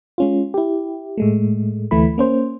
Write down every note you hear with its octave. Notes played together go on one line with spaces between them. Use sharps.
G#3 C#4 F4
E4 G4
A2 G#3 A3
D2 E3 A3 E4 B5
A#3 C#4 C5